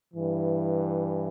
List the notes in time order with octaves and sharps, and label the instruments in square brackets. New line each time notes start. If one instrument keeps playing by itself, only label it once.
[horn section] G2 E3